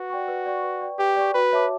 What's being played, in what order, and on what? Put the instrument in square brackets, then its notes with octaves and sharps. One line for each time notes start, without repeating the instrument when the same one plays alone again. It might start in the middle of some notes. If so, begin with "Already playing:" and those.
Already playing: [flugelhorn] F#4 [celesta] B4
[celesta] D5 G5 C#6
B4
D5 G5 C#6
B4
D5 G5 C#6
[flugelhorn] G4 [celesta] B4
[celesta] D5 G5 C#6
[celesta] F#4 [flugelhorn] B4
[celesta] C#5 E5 A5 D6